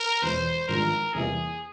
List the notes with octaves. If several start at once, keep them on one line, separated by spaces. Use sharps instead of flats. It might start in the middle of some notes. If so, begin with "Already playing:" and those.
Already playing: A#4
E1 E2 E3 C5
G#1 G2 F3 G#3 A#4
E2 C3 G3 A#3 E4 G#4